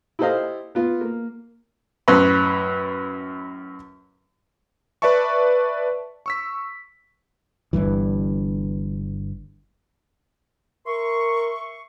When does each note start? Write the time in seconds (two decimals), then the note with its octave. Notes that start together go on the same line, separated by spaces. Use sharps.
0.19 E4 G4 A4 C5 D#5 F5
0.75 B3 F4
1.01 A#3
2.08 F#2 A2 B4 B5 C6
5.02 B4 D5 E5 A5 C#6
6.26 C#6 E6 B6
7.73 G1 C#2 G2 E3
10.87 A#4 E5 C6 C#6